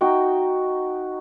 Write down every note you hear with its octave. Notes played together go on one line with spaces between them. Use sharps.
D#4 F#4 G5